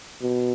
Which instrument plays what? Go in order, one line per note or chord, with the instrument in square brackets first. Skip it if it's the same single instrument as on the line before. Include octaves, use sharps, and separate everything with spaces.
[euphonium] B2